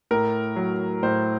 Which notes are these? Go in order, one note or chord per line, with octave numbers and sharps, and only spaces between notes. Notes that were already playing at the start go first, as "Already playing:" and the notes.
A2 A#4
F#3
A2 C5